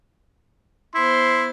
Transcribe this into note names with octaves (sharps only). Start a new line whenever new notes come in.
B3 E4 C5 C6 A6